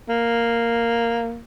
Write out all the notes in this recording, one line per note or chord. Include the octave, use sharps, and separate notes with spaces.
A#3